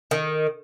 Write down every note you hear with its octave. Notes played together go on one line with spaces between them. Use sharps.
D#3